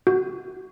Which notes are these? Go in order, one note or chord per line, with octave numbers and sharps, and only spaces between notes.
F#4